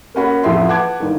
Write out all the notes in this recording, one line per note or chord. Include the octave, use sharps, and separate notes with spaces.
A#3 C#4 F#4 B5
A1 F2 A2 F4 E5 C6
B4 F#5 A5 D6 G#6
G1 D#3